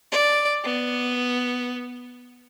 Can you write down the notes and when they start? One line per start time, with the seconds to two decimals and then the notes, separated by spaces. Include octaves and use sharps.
0.12 D5
0.64 B3